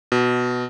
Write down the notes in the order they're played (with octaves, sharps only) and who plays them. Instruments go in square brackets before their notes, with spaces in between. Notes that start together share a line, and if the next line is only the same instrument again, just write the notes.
[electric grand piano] B2